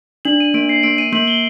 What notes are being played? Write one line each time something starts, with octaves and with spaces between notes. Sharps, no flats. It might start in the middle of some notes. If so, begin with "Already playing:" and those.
D4 F#7
D#7
A#3 D7
C7
A#3 D7
D#7
A#3 F#7
G7